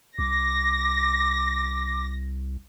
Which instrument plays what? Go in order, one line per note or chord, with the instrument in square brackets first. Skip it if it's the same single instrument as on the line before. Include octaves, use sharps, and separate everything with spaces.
[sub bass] C2 [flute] D6 [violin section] A#6